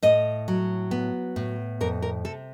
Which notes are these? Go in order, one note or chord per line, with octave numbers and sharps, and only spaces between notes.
A2 D#5
F#3
B3
A2
F2 A#4
A#4
C3 A4